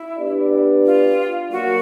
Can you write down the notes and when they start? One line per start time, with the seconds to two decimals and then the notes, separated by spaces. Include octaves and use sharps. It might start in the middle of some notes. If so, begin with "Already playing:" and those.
Already playing: E4
0.18 B3 D4 G4 B4 D5
0.86 F4
1.52 F#3 A#3 F#4